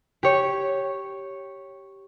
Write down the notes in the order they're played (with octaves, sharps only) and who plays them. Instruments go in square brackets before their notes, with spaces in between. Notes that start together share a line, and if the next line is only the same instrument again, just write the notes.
[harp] G4 C#5